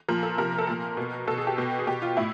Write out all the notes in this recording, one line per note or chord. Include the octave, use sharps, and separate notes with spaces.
A#2 F3 A#4
A4
C3 F3 A#4
A4
A#2 F3 A#4
B2
B2 A4
G#4
G4
B2
G#4
B2 G4
F4
A2 E4